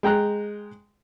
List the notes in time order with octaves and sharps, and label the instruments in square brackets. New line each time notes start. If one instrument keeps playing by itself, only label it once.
[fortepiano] G#3 G5 A#5 F#6